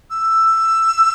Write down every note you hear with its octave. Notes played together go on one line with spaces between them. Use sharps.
E6